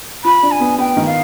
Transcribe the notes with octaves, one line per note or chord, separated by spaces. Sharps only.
F4 B5
D4
G#5
B3
B3 G5
D#3
F5